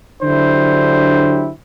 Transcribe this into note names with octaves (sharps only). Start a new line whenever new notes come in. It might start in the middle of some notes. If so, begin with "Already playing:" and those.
D3 F#3 D4 E4 G4 C5